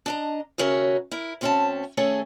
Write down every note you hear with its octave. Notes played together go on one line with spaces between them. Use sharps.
D4 D#5 A#5
D#2 C#3 C#4 F#4 A#4 E5
E4 A#4
D2 C4 C#4 B4 E5 A5
D#3 A3 C#4 G#4 A4 C#5